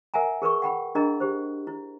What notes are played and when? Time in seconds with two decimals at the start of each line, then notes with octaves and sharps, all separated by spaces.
0.14 A#4 E5 F#5 G#5 A#5
0.42 G#4 A#4 B4 C#6
0.62 F#5 G5 B5
0.95 D4 E4 G#4 A#4 D#5 A#5
1.20 G4 C5
1.67 E4